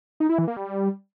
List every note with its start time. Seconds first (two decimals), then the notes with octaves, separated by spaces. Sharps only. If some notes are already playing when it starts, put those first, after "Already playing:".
0.20 D#4
0.29 E4
0.38 E3
0.48 A#3
0.57 G3